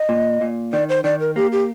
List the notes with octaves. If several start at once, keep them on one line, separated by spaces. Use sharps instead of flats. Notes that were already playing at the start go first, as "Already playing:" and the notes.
Already playing: D#5
A#2
A#2
D#3 D5
C5
D#3 D5
A#4
A#3 G4
G4